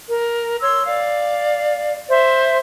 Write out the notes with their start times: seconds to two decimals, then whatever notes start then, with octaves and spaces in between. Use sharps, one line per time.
0.08 A#4
0.61 C#5 C6 E6
0.86 D5 F5
2.09 C5 E5